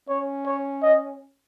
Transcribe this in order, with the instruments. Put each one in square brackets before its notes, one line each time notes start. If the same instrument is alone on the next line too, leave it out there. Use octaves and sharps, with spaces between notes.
[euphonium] C#4 [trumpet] C#5
[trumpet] C#5
D#5